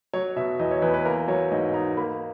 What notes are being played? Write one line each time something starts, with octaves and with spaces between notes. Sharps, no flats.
F#3 C#5
B2 E5
E2 D#5
C#5
E2 B4
B4
A#3 A#4
F#3 C#5
G#2 D#5
D#4 A#5
A#3 B5